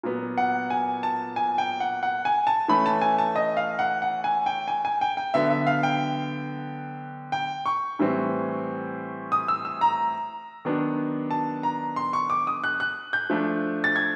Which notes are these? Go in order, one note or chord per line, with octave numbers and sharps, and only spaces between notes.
A#2 F#3 B3
F#5
G#5
A5
G#5
G5
F#5
F#5
G#5
A5
E3 A3 C#4 B5
A5
G#5
A5
D#5
F5
F#5
F#5
G#5
G5
G#5
G#5
G5
G5
D3 F#3 B3 E5
E5
F5
G5
G5
C#6
A2 E3 G3 C4
D#6
E6
E6
A#5
D#3 F#3 B3 D4
A5
A#5
C6
C#6
D6
D#6
F#6
F#6
G6
F3 A3 D4
A6
G#6